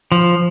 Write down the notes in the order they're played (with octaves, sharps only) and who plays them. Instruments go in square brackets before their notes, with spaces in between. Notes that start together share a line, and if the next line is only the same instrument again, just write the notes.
[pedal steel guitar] F3